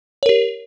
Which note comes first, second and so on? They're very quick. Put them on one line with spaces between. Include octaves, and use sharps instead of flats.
C#5 A#4 G4